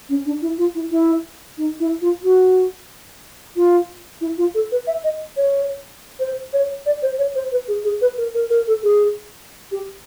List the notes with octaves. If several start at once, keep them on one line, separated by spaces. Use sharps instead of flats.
C#4
D4
E4
F4
E4
E4
D#4
E4
F4
F#4
F4
E4
F4
A4
B4
E5
D#5
C#5
C5
C#5
D5
C5
C#5
C5
B4
G#4
G#4
B4
A#4
A#4
A#4
A4
G#4
G4